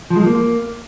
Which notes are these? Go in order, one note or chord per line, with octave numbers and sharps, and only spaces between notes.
F3
G#3
F3
A#3